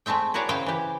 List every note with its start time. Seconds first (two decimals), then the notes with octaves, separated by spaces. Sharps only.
0.06 G#3 A3 C4 E5 G5
0.34 E4 F#4 G#4 A#4 C#5 D5
0.49 C#3 E4 C5 F5 G5
0.66 E3 G4